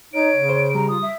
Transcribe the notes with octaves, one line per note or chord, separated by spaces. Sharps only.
D#4 C#5 D7
C#3
C5
G3 A#5
F4 D#6
E5